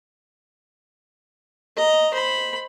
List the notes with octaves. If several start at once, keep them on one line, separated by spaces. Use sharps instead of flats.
D#5 A#5
C5 B5